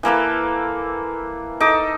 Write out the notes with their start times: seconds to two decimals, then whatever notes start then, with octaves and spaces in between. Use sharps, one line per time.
0.03 E3 A#3 A4 B4
1.60 D#4 A4 D6